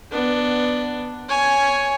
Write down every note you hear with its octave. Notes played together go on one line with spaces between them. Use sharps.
B3 D4
C#5 G#5